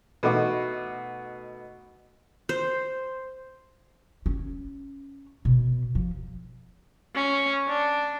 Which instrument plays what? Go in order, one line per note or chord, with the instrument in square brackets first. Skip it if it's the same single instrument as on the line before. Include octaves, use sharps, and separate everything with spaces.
[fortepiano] B2 A3 D#4 F#4 D6
[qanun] C5
[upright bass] C#4
B2
F3
[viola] C#4
D4